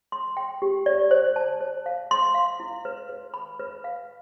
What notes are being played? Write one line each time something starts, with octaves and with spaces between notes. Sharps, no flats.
C6
G5
G4
D5
C5
A5
C5
F5
C6
F5
E4
B4
B4
B5
B4
F5